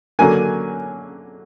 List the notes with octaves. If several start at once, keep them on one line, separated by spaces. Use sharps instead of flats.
D3 F#3 A#3 G#5